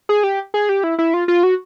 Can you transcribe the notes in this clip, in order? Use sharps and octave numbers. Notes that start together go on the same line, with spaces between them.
G#4
G4
G#4
G4
E4
E4
F4
F4
F#4